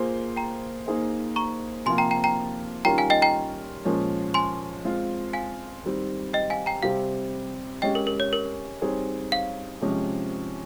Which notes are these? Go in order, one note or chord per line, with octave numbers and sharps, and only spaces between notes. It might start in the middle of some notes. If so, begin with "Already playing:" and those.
Already playing: A#3 F4 G#4 C5
G5 A#5
A#3 D#4 G#4 C5
A#5 C#6
C3 F3 A#3 F4 G#5 C6
G5 A#5
G5 A#5
G5 A#5
D#3 G3 C#4 F4 A#4 G5 A#5
F5 G#5
D#5 G5
G5 A#5
A#2 F3 G#3 C#4
G#5 C6
G#3 C4 F4
F5 G#5
D#3 G3 C4
D#5 G5
F5 G#5
G5 A#5
C3 G3 C4 G4 F5
G#3 C#4 G4 D#5 G5
A#4
A#4
C#5
A#4
G3 C4 D#4 G#4 C#5
F5
C3 F3 G#3 C#4 G4